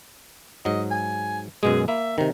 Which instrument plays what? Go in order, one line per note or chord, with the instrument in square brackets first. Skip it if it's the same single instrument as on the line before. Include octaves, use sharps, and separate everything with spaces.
[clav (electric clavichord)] G#2 F#3 [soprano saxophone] D#5
[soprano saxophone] G#5
[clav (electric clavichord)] F#2 B2 G#3 [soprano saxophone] G#4
[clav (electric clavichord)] A#3 [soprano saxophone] E5
[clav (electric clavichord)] C3 D#3 [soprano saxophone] A#4